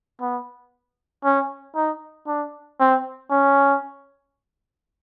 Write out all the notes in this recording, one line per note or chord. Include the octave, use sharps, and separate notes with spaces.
B3
C#4
D#4
D4
C4
C#4